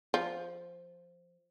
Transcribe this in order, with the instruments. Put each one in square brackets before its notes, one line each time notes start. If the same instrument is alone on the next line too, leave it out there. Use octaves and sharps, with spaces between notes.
[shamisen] F3